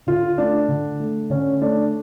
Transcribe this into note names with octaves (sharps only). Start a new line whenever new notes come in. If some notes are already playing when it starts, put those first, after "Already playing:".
D3 F4
A3 D4
D3
A3
D3 C#4
A3 D4